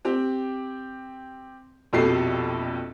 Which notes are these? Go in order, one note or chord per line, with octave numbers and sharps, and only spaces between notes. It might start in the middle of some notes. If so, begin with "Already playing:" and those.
C4 G4
A#1 F2 B2 G4 A4 C7